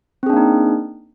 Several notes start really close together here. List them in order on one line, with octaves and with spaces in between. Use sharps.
C4 G#4 D4 A#3 D#4